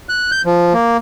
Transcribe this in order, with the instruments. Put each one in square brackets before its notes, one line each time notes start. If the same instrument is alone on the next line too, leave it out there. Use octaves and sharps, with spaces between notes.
[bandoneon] F#6
G6
F3
A#3